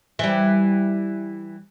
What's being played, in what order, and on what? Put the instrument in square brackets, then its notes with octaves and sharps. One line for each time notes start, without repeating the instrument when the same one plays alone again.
[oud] E3 G3